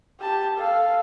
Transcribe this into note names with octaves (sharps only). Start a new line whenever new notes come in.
G4 A5
A4 F5